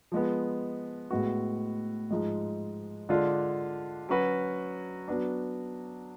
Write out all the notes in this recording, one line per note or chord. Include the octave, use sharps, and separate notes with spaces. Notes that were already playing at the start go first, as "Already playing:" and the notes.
F3 G#3 B3
A2 G#3 B3 F#4
G#2 F3 G#3
D3 G#3 D4 F4
F#3 C#4 F#4 B4
F#3 B3 D4